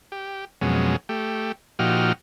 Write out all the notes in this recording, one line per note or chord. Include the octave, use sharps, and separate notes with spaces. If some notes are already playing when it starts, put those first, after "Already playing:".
G4
F2 B2 F#3 G#3 C#4
A3 G4
A#2 F3 D#4 F#4 G4 F6